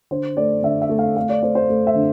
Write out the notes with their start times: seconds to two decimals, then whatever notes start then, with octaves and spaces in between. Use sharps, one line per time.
0.11 D3 C5
0.37 A3 D5
0.63 D3 E5
0.82 E5
0.89 A3
0.99 F5
1.16 A3 F5
1.29 D5
1.43 A3 C5
1.55 C5
1.70 A3
1.87 E5
1.95 D3